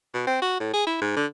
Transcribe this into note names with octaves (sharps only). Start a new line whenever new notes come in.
B2
C4
F#4
A2
G#4
E4
G#2
D3